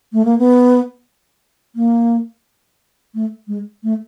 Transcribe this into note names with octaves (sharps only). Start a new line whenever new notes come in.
A3
A#3
B3
A#3
A3
G#3
A3